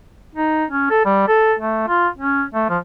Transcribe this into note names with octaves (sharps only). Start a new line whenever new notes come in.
D#4
C#4
A4
G3
A4
A3
F4
C#4
A3
F3